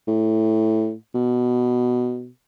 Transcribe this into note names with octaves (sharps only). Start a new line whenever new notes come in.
A2
B2